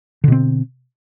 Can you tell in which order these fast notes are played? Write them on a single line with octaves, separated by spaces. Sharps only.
D3 B2 C4